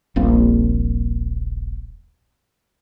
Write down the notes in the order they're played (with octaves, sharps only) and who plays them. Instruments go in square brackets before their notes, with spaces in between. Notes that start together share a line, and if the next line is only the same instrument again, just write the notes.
[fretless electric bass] D#1 A#1 A#3 C4